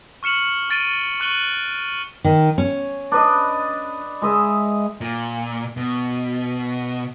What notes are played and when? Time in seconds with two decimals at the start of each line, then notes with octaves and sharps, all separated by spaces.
0.23 C#6 F6 C#7 E7 F#7
0.70 C#6 A6 D7 D#7 G7
1.20 C#6 F#6 D#7 F#7 G7
2.24 D#3
2.58 C#4
3.12 D4 B4 D#5
4.22 G#3 D#5 E5
5.01 A#2
5.77 B2